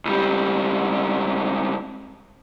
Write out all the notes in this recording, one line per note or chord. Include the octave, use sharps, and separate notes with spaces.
C#2 G3